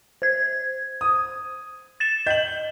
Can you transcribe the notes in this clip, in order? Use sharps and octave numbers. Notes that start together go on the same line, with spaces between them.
C5 G#6
D#6
A6 E7
D#5 G6 F#7